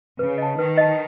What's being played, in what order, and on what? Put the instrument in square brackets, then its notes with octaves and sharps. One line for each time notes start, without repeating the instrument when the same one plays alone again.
[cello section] C#3 [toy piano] B4
[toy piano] D#5 A5
[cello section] D#3 [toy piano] B4
[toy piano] D#5 A5